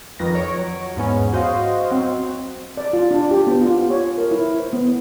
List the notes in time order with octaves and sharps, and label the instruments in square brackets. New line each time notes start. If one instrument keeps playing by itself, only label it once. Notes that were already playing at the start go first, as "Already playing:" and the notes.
[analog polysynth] F2 D#3 B4 A#6
C#5 D7
F#3
E2 G#2 B3 C#4
F#4 C5 D#5 F5
F#3 C4
[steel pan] D5
F4
D4
G4
B3
F4
C#5
A#4
E4
C5
B3